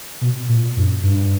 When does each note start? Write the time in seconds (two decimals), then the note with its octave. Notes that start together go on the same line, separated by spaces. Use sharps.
0.21 B2
0.49 A#2
0.77 F#2
1.03 G2